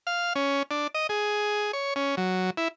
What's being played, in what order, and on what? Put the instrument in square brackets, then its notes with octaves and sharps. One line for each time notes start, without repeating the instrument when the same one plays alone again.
[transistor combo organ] F5
C#4
D4
D#5
G#4
C#5
C#4
F#3
E4